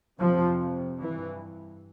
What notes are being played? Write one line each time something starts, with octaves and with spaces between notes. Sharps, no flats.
F2 C3 F3
G2 E3